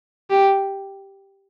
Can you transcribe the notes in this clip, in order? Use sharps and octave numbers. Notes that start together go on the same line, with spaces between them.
G4